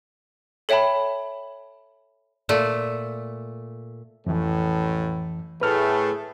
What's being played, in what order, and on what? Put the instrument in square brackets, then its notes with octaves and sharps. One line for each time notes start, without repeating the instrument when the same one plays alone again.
[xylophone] A4 C#5 E5 G5 A5 B5
[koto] A#2 A3
[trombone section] A1 A2 [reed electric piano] F2 E3
[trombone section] A2 A3 G#4 [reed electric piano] B4 F6